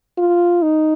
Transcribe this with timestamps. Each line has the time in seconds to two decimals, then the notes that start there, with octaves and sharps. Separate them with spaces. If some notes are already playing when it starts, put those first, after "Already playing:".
0.18 F4
0.62 D#4